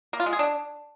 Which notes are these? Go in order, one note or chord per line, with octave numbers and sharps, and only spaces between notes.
A#3
F4
G#3
G#4
D4